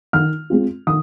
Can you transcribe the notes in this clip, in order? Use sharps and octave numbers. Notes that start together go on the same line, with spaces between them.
D#3 F6
G#3 C4 F4
D#3 D#6